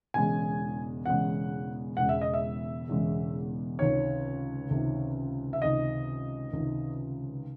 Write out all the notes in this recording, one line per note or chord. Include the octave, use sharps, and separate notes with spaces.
E1 E2 C#3 G#3 G#5
E1 E2 C#3 G#3 F#5
E1 E2 C#3 G#3 F#5
E5
D#5
E5
E1 E2 C#3 G#3
C#2 C3 D#3 C#5
C#2 C3 D#3
E5
C#2 C3 D#3 D#5
C#2 C3 D#3